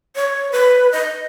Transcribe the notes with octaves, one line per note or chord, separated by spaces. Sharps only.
C#5
B4
D#5